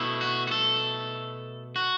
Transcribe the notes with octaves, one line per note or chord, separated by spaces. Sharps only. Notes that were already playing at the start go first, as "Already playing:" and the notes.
Already playing: B2 A3 E4
F#4
F#4
A4
F#4